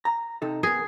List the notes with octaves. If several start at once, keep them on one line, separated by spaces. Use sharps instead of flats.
A#5
C3 D#4 A4
B3 G#4 A#4